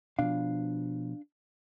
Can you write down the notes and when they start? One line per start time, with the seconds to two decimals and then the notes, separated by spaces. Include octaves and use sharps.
0.19 B2 F3 D4 F5